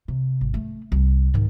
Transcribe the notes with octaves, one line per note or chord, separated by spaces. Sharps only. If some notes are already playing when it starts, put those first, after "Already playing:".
C3
G#1
A3
C2
G#2 D#3